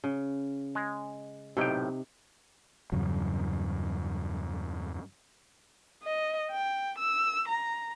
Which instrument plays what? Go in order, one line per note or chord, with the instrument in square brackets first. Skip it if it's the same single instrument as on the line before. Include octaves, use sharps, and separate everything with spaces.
[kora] C#3
[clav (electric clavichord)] G#3
[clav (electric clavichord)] B1 A2 G5 [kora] C3 D#4
[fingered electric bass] E2 G2 C#3 F#3
[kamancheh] D#5
G5
E6
A#5